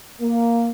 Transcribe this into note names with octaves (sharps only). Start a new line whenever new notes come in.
A#3